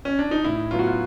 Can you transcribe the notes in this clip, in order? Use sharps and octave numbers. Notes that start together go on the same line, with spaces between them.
C#4
D4
D#4
A2 E4
F#3 B3 F4
F#4
F4